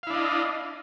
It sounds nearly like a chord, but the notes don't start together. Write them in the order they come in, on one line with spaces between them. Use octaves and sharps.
F5 E4 D4 D#5